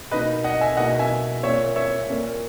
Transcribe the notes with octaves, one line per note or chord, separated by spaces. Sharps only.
B2 A#3 D#4 B4 D#5
D#5 F#5
E5 G#5
B2 A#3 D#4 D#5 F#5
E5 G#5
A#2 A#3 C#4 C#5 E5
C#5 E5
A#2 A#3 C#4